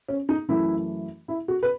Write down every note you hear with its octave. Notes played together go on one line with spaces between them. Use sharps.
C#4
D#4
F#2 E3 A3 E4
E4
F#4
B4